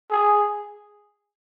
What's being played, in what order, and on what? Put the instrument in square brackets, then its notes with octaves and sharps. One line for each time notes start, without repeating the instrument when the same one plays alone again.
[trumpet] G#4